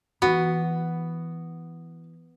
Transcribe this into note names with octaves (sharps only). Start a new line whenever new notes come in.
E3 B3 F#4